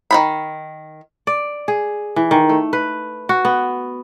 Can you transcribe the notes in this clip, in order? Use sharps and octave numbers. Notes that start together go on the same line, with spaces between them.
D#3 F3 B5
D5
G#4
E3
D#3
A3
B4
F#4
B3